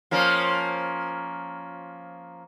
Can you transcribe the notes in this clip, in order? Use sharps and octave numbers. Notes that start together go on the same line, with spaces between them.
F3 A#3 C#4